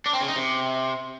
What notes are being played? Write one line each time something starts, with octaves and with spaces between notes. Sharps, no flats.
D4
C4
C#3
D#4
C3